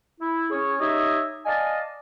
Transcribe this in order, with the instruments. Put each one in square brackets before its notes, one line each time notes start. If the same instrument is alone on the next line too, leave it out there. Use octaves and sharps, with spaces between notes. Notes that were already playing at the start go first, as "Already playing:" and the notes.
[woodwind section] E4
C#4 G#4 C#5
D#4 G4 C#5 D#5 E5
D5 D#5 F5 G#5 A5